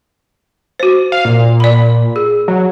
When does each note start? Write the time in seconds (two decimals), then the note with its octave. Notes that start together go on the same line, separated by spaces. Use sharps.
0.80 F#4 C5
1.12 F5
1.25 A#2
1.60 D5 B5
2.16 G#4
2.48 F#3